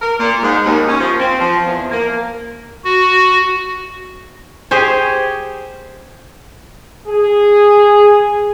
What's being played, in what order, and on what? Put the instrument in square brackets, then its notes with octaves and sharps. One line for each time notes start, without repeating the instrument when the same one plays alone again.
[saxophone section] A#4
A#2
G#2
D#2
C#4
F3
C4
F3
E2
A#3
[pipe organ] F#4
[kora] G4 G#4 C5 C#5
[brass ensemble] G#4